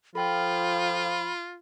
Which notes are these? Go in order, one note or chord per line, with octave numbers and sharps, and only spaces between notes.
F3 F4 A4 G5 B5 F6